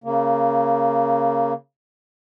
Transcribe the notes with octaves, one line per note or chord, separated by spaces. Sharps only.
C#3 A#3